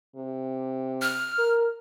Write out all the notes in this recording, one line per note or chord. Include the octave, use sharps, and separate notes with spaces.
C3
F6
A#4